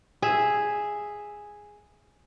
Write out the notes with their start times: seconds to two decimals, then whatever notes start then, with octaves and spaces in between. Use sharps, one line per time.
0.22 G#4 E5